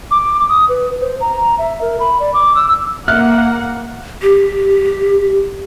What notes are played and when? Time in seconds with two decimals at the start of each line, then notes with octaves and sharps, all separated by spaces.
0.11 D6
0.49 D#6
0.69 B4
1.01 C5
1.21 A#5
1.58 E5
1.81 A#4
2.00 B5
2.20 D5
2.34 D6
2.55 E6
3.08 A#3 E5 F#5 F6 F#6
4.22 G4